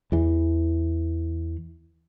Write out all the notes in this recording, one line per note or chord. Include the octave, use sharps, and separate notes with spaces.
E2 E3